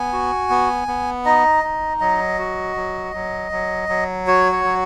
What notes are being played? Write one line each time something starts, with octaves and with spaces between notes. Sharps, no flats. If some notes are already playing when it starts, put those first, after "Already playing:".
Already playing: B3 G#5
F#4
B3
B3
D#4 D#5
D#4
F#3 D#5
F#4
F#3
F#3
F#3
F#3
F#4 C#5
C#5
F#3